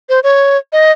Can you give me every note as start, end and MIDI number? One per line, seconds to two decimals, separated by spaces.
0.09 0.20 72
0.24 0.58 73
0.73 0.92 75